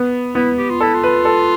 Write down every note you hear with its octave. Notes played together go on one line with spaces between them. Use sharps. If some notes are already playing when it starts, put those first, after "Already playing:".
Already playing: B3
B3 E4
G4
F4
E4 A4
F4
B4
A4